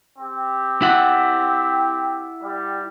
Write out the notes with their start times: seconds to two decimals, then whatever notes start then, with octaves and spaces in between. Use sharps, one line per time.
0.19 C4 G4
0.82 E4 F#5
2.42 G3